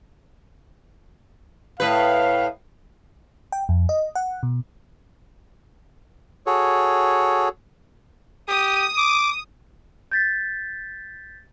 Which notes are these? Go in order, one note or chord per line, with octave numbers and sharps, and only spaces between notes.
A2 B4 F5
G5
F2
D#5
F#5
B2
F#4 G#4 A4 C#5
G4 D#6
D6
G6 A6 B6